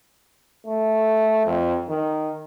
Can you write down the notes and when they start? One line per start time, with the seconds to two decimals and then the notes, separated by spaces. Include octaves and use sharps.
0.66 A3
1.45 F2
1.89 D#3